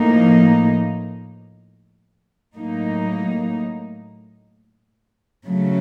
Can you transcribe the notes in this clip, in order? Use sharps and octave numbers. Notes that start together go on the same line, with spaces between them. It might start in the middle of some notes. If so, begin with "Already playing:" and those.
Already playing: A2 F3 A#3 D#4
A2 F#3 A#3 D#4
C#3 F#3 A3